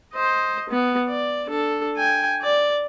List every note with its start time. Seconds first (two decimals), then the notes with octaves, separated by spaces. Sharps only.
0.14 C5 D#5
0.70 B3
1.08 D5
1.46 D4 A4
1.97 G5 G#5
2.42 D5